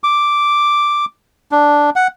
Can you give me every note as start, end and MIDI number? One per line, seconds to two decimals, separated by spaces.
0.04 1.05 86
1.52 1.90 62
1.96 2.07 78